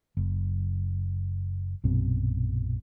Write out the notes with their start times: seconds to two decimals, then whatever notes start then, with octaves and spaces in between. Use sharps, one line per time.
0.17 F#1
1.84 A#1 F#2 B2 C4